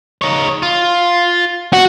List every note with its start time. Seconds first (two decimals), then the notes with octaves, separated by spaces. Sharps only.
0.22 D#4 C#5
0.63 F4
1.73 F#4